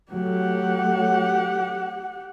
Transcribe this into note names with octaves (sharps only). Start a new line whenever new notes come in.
F#3 A3 G4 F#5